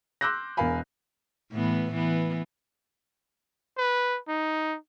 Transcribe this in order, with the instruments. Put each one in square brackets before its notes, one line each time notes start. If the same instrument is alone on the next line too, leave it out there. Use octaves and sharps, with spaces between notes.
[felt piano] C6 D6 E6 F#6 G6 A#6
E1 E2 A#4 F5 G#5 B5
[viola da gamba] A2 E3 B3
E3 B3
[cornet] B4
D#4